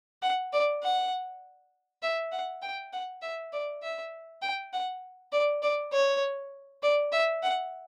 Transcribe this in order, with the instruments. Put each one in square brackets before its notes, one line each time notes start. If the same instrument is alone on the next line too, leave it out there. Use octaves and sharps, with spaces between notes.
[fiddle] F#5
D5
F#5
E5
F#5
G5
F#5
E5
D5
E5
G5
F#5
D5
D5
C#5
D5
E5
F#5